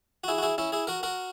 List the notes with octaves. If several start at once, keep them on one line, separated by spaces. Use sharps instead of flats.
F#4
E4 G#4
F#4
E4 G#4
C#4 E4
E4 G#4
F#4 A#4
F#4 A#4